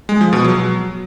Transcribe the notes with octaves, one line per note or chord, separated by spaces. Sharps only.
G#3
F3
B2
F#3